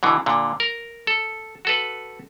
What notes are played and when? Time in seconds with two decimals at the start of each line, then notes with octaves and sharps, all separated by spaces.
0.03 B2 D3 E3
0.26 A#2 D3
0.60 A#4
1.07 A4
1.65 F#4 A4 B4